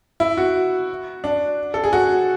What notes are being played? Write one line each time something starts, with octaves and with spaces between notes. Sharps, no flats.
E4
F#4
D4
A4
G#4
F#4